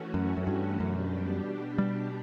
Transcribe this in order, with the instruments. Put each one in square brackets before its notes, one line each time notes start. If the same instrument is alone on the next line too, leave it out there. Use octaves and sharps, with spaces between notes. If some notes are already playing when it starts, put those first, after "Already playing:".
Already playing: [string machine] E3 A3 C#4 F#4
[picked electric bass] F#2
F#2
G2
[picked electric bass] F#2 [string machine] B2 G3 D4 G4
[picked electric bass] G3